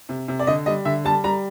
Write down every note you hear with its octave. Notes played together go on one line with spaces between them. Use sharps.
C3
C3
D5
D3 D#5
G3 D#5
D3 E5
G3 A5
G3 A#5